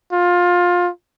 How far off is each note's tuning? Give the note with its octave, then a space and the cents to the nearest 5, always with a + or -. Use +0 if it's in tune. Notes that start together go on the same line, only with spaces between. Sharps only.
F4 +20